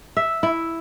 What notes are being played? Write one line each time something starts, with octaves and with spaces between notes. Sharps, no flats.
E5
E4